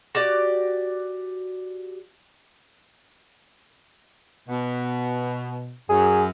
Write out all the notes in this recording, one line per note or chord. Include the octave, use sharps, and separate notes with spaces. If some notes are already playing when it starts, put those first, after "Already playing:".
F#4 G4 D5
B2
F#2 G#4